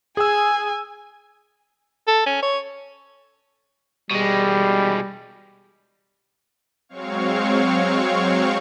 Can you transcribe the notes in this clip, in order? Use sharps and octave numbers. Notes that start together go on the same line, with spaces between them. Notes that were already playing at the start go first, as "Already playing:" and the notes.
G#4 G#5 E6
A4
C#4
C#5
B2 G3 G#3
F#3 G#3 C4 C#5 F5 C#6